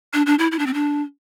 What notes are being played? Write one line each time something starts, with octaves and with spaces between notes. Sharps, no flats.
D4
D4
E4
E4
D4
C4
D4